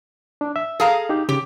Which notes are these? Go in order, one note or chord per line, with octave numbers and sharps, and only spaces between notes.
D4
E5
G#4 A4 F5 A#5
D#4 G4
C#3 G4